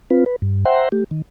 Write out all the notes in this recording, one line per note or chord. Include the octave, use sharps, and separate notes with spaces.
C4 F4 B4
B4
G2
C5 E5 F#5 G5 A#5 C6
A3 G4
D#3